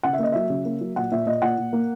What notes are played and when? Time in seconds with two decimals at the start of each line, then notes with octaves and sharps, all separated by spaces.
0.03 C#3 F#5
0.13 E5
0.19 A#3 D#5
0.32 F#3 E5
0.50 C#3
0.65 A#3
0.81 F#3
0.96 A#2 F#5
1.12 A#2 E5
1.26 A#2 D#5
1.42 A#2 F#5
1.58 A#2
1.73 A#3